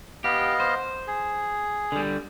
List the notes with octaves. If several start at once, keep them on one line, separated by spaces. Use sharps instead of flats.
B3 G4 D#5 F5
C5
G#4
D3 G3